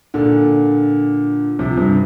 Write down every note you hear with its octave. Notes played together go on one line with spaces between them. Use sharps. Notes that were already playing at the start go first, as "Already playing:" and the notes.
A#2 D3
C3 F3
G2 C3